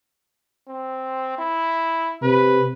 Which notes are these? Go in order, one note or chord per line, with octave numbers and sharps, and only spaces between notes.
C4
E4
C3 B4